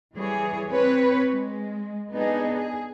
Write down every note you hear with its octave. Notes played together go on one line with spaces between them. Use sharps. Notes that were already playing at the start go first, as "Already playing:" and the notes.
E3 G3 G#4 C#5
C4 B4 C#5
G#3
B3 D4 D#4 G#4
G#4